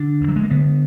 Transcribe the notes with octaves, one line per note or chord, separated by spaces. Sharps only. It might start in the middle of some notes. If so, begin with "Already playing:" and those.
Already playing: D3 D4
D2
F#3
G#3
A#3
D3 B3